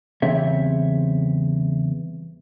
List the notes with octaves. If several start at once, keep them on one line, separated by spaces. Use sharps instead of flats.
E2 C#3 G3 C4 C#5 E5